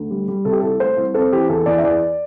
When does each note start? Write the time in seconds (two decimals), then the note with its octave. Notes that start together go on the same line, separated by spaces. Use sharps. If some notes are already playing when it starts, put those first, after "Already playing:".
Already playing: D2
0.11 G3
0.28 G3
0.45 C3 A4
0.52 G4
0.60 C2 A4
0.80 A3 C5
0.97 C2
1.14 C4 A4
1.32 E3 G4
1.49 E2 A4
1.66 E2 D5
1.78 E5
1.83 E2 D5